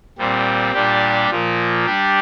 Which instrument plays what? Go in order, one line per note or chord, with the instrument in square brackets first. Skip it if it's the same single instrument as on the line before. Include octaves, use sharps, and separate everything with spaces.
[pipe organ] A#2 G3 C4
A#2 G3 D4 G4
A#2 F3 A#3
G3 D4 G4